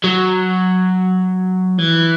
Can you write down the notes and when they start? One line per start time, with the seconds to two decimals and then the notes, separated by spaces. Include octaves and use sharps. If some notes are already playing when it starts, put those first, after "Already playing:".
0.04 F#3
1.79 E3